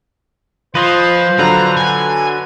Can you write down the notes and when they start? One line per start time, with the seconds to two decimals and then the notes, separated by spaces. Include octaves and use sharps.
0.75 F3 F4 B4 C5 D#5
1.39 D3 F#3 B4 A#5
1.77 G#5